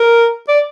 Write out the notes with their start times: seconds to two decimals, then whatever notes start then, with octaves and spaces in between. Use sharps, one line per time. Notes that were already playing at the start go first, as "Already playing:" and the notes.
Already playing: A#4
0.48 D5